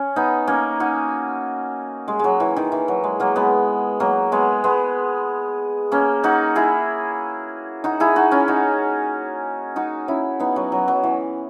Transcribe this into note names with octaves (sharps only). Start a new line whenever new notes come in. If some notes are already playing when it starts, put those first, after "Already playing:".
Already playing: C#4
B3 D#4
A#3 C#4
D#4 F#4
G#3
F#3 G#3
E3
D#3
E3
F#3
G#3
F#3 A#3
G#3 B3
F#3 A#3
G#3 B3
G#3 B3
A#3 C#4
D#4 F#4
E4 G#4
D#4 F#4
E4 G#4
D#4 F#4
C#4 E4
D#4 F#4
D#4 F#4
C#4 E4
B3 D#4
F#3
F#3
F#3
E3